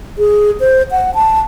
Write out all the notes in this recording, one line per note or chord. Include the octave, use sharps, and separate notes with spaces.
G#4
C5
F#5
A5